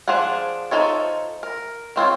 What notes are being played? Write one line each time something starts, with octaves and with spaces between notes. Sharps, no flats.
F3 D4 F4 G#4 F#5
F3 F#3 D#4 A4 C#5
A#4
D#3 C4 F4 C#5